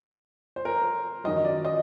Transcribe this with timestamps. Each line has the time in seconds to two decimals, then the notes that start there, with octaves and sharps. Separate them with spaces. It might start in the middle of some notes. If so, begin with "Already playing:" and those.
0.56 C5
0.65 A#4
1.24 F#2 D#3 F#3 D#5
1.45 D5
1.65 D#5